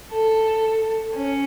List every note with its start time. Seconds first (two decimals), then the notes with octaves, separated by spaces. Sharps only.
0.12 A4
1.15 C#4